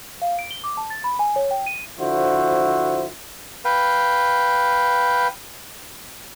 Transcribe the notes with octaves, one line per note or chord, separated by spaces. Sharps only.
F5
D7
G7
D6
A5
A6
B5
G#5
C#5
G5
D#7
D3 F3 E4 F#4 C5
B4 F5 G5